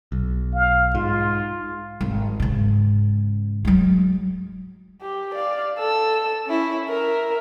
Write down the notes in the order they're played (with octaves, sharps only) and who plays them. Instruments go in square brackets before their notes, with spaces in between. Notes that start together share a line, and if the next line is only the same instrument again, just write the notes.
[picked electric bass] B1
[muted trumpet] F5
[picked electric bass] G#2 [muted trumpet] F4
[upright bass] G#1
G#2 C#3
F#3 G#3
[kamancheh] G4
D5 F5
A4 E6
C#4 E4
A#4 E5